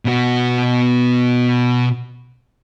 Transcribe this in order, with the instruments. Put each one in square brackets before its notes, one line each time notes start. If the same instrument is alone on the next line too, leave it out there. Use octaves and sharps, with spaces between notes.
[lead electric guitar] B2 F#4